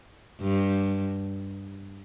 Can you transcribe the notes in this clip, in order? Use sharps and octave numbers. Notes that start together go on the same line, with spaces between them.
G2